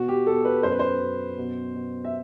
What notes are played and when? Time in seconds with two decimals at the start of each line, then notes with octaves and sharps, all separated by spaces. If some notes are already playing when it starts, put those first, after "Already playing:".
Already playing: B2 F#4
0.08 G4
0.27 B2 A4
0.45 B4
0.63 F#2 C5
0.71 B4
0.79 C5
1.00 F#2
1.37 B2
1.75 B2
2.05 E5